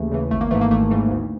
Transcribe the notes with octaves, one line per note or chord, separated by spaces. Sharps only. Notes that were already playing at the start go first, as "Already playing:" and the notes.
Already playing: D#2 C#3 E3 A3
C#3 E3
G#1 A3
A#3
G#2 E3 A3
A#3
G#1 A3
G#2 E3
D2